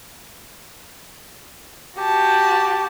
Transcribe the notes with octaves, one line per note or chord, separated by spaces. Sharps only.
F#4 G4 A5